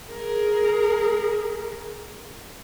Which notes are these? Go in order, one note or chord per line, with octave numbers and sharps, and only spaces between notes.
G#4 A#4